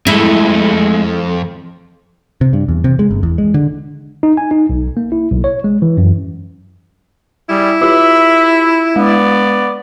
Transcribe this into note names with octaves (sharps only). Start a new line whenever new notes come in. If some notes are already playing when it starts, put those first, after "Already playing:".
F2 G#3 A3 E4
C3
G2
E2
C3
G#3
G1
E2
G#3
D3
D#4
G#5
D#4
B1
A#3
E4
B1
C#5
G#3
E3
F#2
G3 E4 G#4
F4 G4 E5 B5
G#3 B3 D5